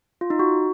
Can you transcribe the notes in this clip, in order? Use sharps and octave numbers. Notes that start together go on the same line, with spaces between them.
F4
D#4
F#4